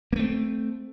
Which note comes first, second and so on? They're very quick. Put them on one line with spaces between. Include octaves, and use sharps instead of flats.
A#3 A3 C4